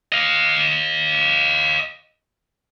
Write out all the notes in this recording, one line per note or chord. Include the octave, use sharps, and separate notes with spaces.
D#5 F5